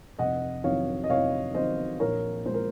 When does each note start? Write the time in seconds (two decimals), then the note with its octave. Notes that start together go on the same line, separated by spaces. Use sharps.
0.19 F1 D#5 F#5
0.64 F2 D#3 F#3 C#5 F5
1.04 D#5
1.09 F1 C#5 F5
1.54 F2 D#3 F#3 C5 D#5
2.00 A#1 A#4 C#5
2.46 A#2 G#3 C5
2.54 A#4